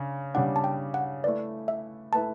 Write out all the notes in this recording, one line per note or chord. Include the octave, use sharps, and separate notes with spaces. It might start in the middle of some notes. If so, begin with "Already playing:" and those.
Already playing: C#3 D4
C#3 G3 D4 F#5
A5
G5
F#5
A3 E4 B4 D5
E5
A3 E4 B4 A5